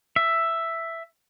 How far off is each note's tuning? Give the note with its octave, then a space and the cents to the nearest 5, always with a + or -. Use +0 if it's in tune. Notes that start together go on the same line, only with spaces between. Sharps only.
E5 +5